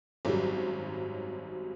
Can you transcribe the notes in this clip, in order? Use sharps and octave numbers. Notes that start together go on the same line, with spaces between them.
G#1 F#2 F#3 G3